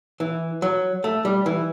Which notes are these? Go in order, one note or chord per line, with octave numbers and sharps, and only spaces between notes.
E3
F#3
A3
G3
E3